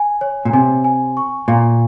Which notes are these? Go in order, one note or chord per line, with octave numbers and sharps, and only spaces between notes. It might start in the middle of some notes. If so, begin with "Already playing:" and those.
Already playing: G#5
C#5
A#2
C3 G#5
G#5
C#6
A#2 F5